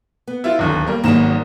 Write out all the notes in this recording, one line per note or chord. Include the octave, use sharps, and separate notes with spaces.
B3
E4 F4
D1 D#2 D3
G3 A#3
G#1 G#2 F#3 G3 A#3 E7